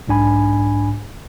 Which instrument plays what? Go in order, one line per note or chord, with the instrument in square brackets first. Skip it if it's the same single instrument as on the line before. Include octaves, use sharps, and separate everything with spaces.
[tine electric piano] B1 G#2 D4 G#5 B5